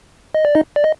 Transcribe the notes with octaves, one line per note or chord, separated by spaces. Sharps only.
D#5
D5
D#4 D#5
D5
D#5